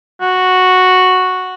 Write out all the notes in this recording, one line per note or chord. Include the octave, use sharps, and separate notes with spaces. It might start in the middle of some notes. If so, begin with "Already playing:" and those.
F#4